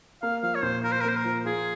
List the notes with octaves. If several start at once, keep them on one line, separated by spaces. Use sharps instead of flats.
A#3 F5
F3 F5
C#5
A#2 C5
F4 A#4
C5
A#4
A#3 C5
A#4
F3
F4 G#4